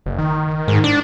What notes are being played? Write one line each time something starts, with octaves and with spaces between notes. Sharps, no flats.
F#1
D#3
G#2
D4